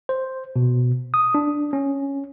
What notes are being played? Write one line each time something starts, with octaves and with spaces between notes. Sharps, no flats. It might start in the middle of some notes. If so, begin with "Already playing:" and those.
C5
B2
D#6
D4
C#4